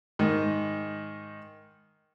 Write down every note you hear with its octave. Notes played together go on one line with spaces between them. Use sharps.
G#2 D#3